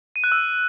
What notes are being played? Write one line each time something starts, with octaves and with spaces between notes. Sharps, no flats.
D#7
F#6
E6